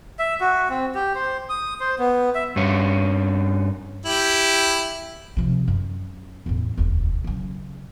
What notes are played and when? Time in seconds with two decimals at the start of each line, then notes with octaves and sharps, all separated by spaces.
0.19 E5
0.41 F#4
0.70 C4
0.95 G4
1.15 C5
1.49 D#6
1.80 C5
1.99 B3
2.35 E5
2.56 G2 C#4
4.05 E4 G4
5.37 C3 F3
5.68 F#2
6.46 A1 E2
6.77 E1 D2
7.24 C#3 F#3